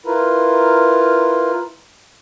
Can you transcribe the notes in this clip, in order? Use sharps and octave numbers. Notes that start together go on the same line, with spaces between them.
E4 F4 A#4 B4